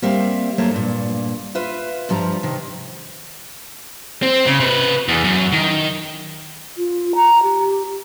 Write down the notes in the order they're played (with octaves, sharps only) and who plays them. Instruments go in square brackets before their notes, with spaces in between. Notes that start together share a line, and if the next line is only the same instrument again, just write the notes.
[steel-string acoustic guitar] G3 A#3 C4 E5 F5
F#2 A3 A#3 C5 C#5
G2 A#2
F4 B4 E5
G2 F3 G3 A#5
C3 D#3
[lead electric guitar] C4
C#3
C3 B4
E2
F#2
D#3
[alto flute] F4
A#5
G4